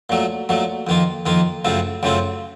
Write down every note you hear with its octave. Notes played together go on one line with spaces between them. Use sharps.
A#2 F#3 A3
A#2 F#3 A3
F2 D#3 A#3 F4
F2 D#3 A#3 F4
F#2 C#3 A3 C4 F4
F#2 C#3 A3 C4 F4